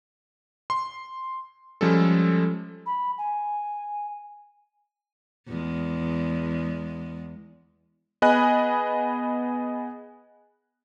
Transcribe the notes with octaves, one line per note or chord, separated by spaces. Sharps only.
C6
F3 G3 G#3 C#4 A4
B5
G#5
E2 G#3
B3 G#4 D#5 G#5 B5 F#6